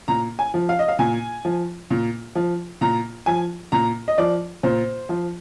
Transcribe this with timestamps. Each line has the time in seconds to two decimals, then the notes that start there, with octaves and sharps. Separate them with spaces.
0.08 A#2 A#5
0.39 G#5
0.54 F3
0.69 F5
0.79 D#5
0.88 F5
0.99 A#2 G#5
1.45 F3
1.90 A#2
2.35 F3
2.81 A#2 A#5
3.26 F3 G#5
3.72 A#2 A#5
4.08 D#5
4.18 F3 D5
4.63 A#2 C5
5.09 F3